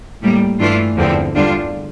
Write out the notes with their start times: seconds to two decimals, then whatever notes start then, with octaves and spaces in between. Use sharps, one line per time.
0.21 A2 G3 A#3
0.59 G2 E3 A3 D4 F4
0.97 E2 D3 F3 C4
1.35 E2 D3 G3 D4 F4